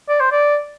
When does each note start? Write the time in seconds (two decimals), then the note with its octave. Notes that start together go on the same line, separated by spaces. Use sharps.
0.09 D5
0.20 C5
0.32 D5